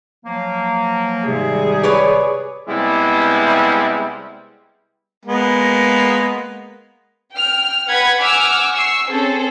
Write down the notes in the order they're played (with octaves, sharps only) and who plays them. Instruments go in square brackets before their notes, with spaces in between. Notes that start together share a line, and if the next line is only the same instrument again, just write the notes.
[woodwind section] F3 F#3 A#3
[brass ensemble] G#2 D#3 G3 [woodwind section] C3 [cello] G#4
[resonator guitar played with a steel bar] B4 C#5 D5
[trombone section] C3 G3 G#3 B3 E4
[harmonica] G#3 A#3 B3
[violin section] G5 F6
B4 F#5 B5 G#6
F#5 G#5 D6 E6 F6
C#6 E6 C7
C4 C#4 G#4 A4 C5